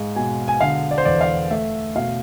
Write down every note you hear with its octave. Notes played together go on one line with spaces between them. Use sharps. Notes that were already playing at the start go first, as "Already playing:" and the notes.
Already playing: G#2 G#3 F5
B2 G#5
G#5
D3 F5
D5
C5
E2 D5
F5
A3 E5
B2 F5